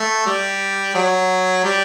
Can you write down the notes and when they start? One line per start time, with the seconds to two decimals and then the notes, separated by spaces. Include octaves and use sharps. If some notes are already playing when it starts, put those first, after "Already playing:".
Already playing: A3
0.26 G3
0.95 F#3
1.64 G3